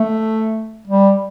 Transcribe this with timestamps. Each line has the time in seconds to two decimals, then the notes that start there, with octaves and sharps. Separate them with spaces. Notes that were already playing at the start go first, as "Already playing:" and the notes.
Already playing: A3
0.88 G3